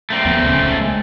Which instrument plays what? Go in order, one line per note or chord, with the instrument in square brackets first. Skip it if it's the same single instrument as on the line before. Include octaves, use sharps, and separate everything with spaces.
[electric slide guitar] A3 A#3 C4
[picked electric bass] D2 F3 B3
D#1 C#2 C#3
G#3